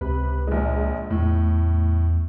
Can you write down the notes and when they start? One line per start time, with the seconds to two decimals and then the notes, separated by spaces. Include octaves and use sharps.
0.01 C#2 C3 B4
0.47 A#1 G#3
1.11 E2 A2